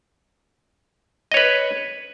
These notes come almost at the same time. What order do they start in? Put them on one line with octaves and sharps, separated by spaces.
D#5 C#5 B4